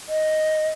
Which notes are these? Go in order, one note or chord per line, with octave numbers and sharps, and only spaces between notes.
D#5